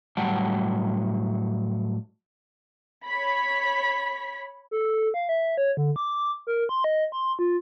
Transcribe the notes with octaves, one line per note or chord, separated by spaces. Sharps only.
A2 F#3 G3 F#5 G5 A5
C#5 B5 B6
A4
F5
E5
C#5
D3
D6
A#4
C6
D#5
C6
F4